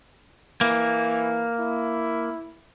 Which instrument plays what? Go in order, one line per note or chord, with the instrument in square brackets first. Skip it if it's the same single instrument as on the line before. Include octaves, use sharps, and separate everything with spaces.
[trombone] E3 [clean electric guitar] A#3
[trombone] E4